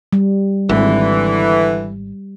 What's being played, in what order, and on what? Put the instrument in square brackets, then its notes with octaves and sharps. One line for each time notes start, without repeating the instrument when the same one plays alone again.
[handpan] G3
[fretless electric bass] G#1 [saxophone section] D3 E3